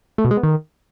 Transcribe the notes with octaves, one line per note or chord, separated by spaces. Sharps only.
A3
B2
G#3
B3
D#3